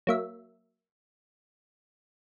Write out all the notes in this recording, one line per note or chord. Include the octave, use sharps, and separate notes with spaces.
F#3 A#3 E5